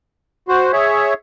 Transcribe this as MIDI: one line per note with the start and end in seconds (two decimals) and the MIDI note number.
0.48 0.72 66
0.48 0.72 72
0.73 1.14 68
0.73 1.14 73
0.73 1.14 76